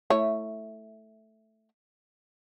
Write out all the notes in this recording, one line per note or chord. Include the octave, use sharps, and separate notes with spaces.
A3 E4 C#5